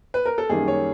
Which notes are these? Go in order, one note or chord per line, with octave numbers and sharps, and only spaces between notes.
B4
A#4
A4
F#2 D#3 G3 A#3 G#4
C#5